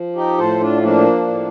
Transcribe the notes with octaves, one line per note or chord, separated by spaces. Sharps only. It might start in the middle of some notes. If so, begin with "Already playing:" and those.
Already playing: F3
D#4 G4
A2 A4 C5
D4 F4
F3 A#3 D4
A2